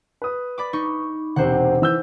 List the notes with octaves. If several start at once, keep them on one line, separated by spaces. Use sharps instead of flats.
B4 D#6
D5 B5 D6
D#4 C#6
E1 C3 C4 C5 F#5
E3 E6 G6